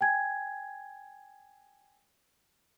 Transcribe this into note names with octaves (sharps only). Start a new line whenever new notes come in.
G5 G#5 G#6